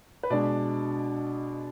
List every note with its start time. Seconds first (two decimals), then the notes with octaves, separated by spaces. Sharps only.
0.23 B4
0.30 B2 G#3 D4 D5